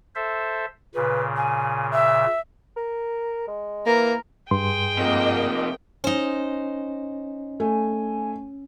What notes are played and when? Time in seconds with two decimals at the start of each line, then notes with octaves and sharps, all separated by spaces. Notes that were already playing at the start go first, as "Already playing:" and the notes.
0.15 A4 C5 E5
0.95 A#2 C#3 B4
1.36 G#5
1.92 E5
2.76 A#4
3.48 G#3
3.87 E3 A#3 A#4
4.51 G2 G#4 G5 C6
4.98 C3 F3 A#3 D#5
6.04 C#4 D#4 C5
7.60 A3 G#5